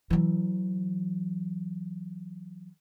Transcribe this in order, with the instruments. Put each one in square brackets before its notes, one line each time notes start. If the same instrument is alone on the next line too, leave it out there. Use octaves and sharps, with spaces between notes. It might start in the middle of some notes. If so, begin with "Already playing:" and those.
[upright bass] E3 F#3